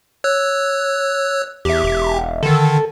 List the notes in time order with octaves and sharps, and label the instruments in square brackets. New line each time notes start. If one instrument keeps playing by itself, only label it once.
[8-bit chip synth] C#5 E6 F#6
[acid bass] E2 [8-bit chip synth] G4 E5
[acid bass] E1
[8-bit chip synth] D3 D#3 [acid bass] A4